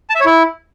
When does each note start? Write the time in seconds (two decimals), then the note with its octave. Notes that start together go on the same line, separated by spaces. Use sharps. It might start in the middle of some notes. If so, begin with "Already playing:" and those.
0.10 A5
0.15 E5
0.20 C#5
0.26 E4